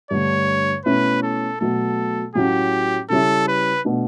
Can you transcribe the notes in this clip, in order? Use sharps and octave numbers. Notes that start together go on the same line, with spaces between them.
G2 D3 A3 C#5
B2 A3 C#4 E4 B4
A4
B2 F#3 A3 A4
A2 F#3 A3 C#4 G4
C#3 G3 C#4 E4 A4
B4
B2 A3 D4